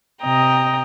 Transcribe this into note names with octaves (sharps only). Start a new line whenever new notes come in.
C3 D#5 G5 A#5